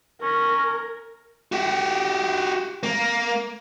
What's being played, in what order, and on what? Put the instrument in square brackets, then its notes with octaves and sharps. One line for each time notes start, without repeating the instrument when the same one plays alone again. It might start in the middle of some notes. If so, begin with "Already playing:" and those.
[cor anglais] C#4 [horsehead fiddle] A#4
[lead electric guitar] F#4 G4
A#3